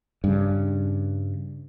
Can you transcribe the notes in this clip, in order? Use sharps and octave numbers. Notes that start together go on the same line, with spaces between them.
G2 C#3